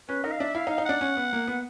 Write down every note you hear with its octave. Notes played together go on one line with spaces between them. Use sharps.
C#4 B4
D#4 A#4
F5
D4 E5
E4 F5
D#4
F5
D#4
D4 F#5
C#4
B3
A#3
B3